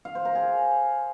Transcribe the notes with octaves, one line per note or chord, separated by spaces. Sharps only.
F5
C5
A#4
G#4